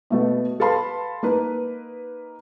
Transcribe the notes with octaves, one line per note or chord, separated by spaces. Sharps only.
B2 A3 B3
A4 B4 F5 A5 B5 C6
A#3 D#4 B4